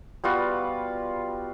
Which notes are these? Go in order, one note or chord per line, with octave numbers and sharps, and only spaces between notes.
G3 B3 F4 F#4